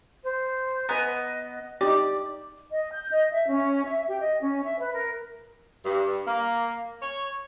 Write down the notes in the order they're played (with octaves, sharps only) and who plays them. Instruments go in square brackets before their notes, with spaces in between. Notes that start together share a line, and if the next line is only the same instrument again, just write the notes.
[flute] C5
[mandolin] B3 [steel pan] B4 G#5 A#5 [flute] D#5
[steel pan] D#4 G4 [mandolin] D5
[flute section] D#5
G6
D#5
E5
C#4
E5
G4
D#5
C#4
E5
B4
A#4
[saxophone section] G2
A#3
C#5